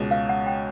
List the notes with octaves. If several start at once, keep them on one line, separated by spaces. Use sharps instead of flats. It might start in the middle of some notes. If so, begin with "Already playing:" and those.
Already playing: C#2 B2 G#3 C#4
F5
F#5
G5